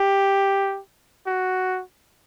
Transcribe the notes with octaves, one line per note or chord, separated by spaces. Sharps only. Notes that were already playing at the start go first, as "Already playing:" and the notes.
Already playing: G4
F#4